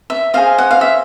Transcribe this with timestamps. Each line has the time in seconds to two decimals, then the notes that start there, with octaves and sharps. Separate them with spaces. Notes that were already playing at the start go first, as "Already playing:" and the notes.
0.10 E5
0.34 G#4 C5 D#5 F5
0.58 F#5
0.71 F5
0.81 E5